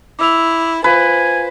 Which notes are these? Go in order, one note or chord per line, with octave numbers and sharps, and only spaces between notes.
E4 D6 E6 F7
F4 B4 C5 F5 G#5